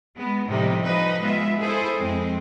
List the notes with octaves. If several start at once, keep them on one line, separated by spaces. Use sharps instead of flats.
G#3 B3
A2 C3 F3 G3 D#4
F3 D#4 B4 D#5
G#3 B3 F4 E5
E4 G#4 A4 C5
F2 G#3 C4